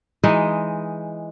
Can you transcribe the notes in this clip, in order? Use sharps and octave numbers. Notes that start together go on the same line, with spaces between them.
E3 G#3 D#4